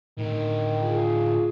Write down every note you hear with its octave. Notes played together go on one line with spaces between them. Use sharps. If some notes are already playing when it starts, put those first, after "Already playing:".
A2 D3 D#3
F4 G#4